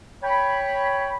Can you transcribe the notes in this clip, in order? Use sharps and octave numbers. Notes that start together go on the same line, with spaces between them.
C#5 G5 B5